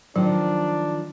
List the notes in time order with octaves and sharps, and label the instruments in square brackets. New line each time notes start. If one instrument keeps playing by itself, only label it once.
[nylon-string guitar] D#3 F3 [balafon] F#3 [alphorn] D4